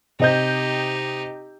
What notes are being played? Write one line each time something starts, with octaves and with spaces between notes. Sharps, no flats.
C3 D#4 G4 D#5 G6